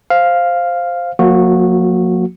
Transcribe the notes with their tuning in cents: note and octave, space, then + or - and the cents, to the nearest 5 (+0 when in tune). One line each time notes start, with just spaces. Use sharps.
C5 +0 F5 +0
F3 +45 A#3 -15 F#4 -15